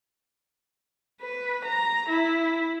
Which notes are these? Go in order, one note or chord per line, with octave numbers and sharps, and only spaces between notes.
B4
A#5
E4